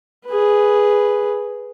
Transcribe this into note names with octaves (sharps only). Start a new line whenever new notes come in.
G#4 B4